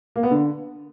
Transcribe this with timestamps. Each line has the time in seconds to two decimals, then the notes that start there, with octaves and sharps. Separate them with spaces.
0.16 A#3
0.23 B3
0.31 D3